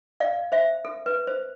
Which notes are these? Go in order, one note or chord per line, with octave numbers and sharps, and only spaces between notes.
D5 F5
C5 E5
A4
B4
C5